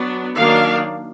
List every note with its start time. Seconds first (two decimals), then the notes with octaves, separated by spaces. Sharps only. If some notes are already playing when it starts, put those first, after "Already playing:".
Already playing: F#3 B3 D4
0.35 D#3 F#3 A#3 D4 F5